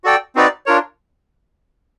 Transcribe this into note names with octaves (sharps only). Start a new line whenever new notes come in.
F#4 A4 D5 G5
C4 D#4 F#4 B4 D5
D4 F4 A#4 C#5